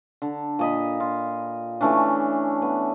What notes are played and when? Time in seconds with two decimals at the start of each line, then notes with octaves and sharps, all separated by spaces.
0.22 D3
0.59 A#2 D#5 B5
1.00 F4
1.81 E3 A3 C#4 D4
2.62 B3